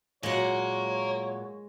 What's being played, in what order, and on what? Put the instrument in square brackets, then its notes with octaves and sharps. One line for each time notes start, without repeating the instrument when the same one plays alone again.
[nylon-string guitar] A#2 F#3 [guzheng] G#3 F#5 [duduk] C#5 [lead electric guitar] F5 A#5